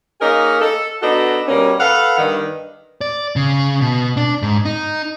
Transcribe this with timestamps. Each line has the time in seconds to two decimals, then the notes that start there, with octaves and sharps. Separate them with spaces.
0.21 A#3 C#4 D#4 G#4 A#4
0.61 A4
1.02 B3 D4 D#4 F#4 A4
1.48 B2 G3 A#3 C#4
1.80 A4 B4 F5 F#5
2.18 G2 D#3
3.01 D5
3.36 C#3
3.81 B2
4.17 D4
4.42 G#2
4.65 D#4